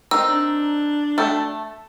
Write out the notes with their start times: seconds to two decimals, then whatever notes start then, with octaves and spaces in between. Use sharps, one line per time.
0.11 C4 D#4 A#4 E6
0.28 D4
1.18 A3 A4 E5 G5